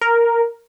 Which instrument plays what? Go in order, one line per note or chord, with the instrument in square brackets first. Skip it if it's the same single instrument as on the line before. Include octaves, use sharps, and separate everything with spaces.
[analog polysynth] A#4